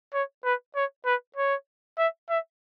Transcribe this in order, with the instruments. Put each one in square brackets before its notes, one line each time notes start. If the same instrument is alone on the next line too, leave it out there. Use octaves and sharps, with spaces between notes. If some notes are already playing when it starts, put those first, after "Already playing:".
[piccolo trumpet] C#5
B4
C#5
B4
C#5
E5
E5